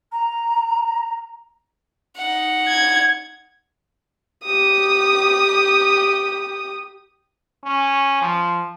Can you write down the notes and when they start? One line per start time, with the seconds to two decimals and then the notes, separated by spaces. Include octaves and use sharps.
0.12 A#5
2.16 D#4 F#5
2.68 G#6
4.44 G4 D#6
7.64 C#4
8.22 F3